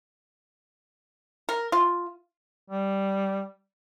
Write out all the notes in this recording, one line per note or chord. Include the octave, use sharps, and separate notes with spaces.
A#4
F4
G3